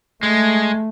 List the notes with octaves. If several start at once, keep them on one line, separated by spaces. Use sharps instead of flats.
G#3 A3